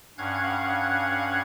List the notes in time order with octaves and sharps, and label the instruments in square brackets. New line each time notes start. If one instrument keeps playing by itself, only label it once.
[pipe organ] G2 C#4 F5 F#5 F#6 G#6